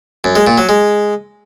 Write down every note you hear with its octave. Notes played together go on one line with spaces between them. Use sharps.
F#2
G#3
A#2
F#3
G#3